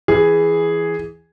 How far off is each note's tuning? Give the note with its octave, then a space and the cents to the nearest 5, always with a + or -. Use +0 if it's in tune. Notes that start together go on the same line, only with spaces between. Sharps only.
E3 +5 G#4 +0